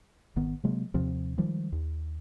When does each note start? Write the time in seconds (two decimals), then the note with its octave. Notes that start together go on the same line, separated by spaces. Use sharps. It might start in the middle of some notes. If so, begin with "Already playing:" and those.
0.36 G#1 D#3 B3
0.64 C3 F#3 G#3 A#3
0.94 D#2 C3 F3 C4
1.38 D#3 F3 G3 G#3
1.72 D#2